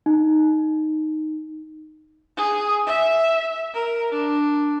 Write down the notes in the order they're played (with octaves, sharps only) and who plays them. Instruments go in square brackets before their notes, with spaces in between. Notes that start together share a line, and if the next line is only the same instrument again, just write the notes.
[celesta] D#4
[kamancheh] G#4
E5
A#4
D4